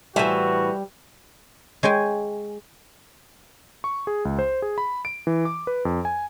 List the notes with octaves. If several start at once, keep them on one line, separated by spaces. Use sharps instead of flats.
A2 E3 G3 F#4 C5 E5 G#5
G#3 C#5 G5 G#5
C#6
G#4
C#2
C5
G#4
B5
D7
E3
D6
B4
F2
G#5